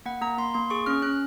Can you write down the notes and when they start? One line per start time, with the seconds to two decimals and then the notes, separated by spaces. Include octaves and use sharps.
0.06 A#3 F#5
0.22 A#3 A#5
0.38 A#3 C6
0.54 A#3 C6
0.70 G#4 C#6
0.86 C#4 F6
1.02 C#4 F#6